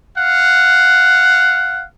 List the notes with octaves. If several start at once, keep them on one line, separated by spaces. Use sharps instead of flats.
F5 F#5